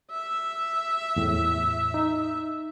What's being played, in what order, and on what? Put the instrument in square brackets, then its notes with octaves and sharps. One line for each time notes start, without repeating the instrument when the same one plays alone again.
[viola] E5
[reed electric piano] E2 A2
D#4